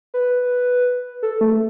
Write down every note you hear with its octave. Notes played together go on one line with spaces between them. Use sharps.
B4
A4
A3